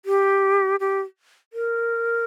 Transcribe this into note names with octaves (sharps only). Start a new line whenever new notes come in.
G4
G4
A#4